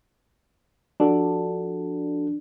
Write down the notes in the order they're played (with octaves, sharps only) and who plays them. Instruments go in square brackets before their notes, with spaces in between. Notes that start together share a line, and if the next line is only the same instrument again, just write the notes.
[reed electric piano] F3 F#4 A4 [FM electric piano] D4